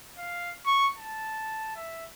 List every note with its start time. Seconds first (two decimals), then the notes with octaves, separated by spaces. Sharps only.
0.18 F5
0.66 C#6
0.98 A5
1.76 E5